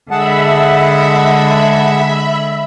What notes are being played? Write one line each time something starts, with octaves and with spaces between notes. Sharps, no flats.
D3 G#3 G#4 E5 F#5 A5 B5